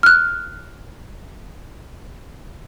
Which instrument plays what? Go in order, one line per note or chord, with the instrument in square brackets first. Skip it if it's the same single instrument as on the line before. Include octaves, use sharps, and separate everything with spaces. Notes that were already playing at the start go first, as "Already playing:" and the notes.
[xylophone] F6 F#6